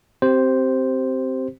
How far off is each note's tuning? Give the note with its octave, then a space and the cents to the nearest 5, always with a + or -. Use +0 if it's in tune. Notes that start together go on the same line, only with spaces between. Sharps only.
C4 +0 G4 -20 C5 +0